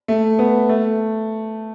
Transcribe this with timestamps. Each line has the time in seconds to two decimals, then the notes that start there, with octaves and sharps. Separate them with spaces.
0.08 A3
0.39 B3
0.69 A3